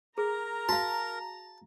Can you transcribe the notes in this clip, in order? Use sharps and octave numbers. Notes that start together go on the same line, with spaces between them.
G#4 A#4 A#5
F#4 F5 A5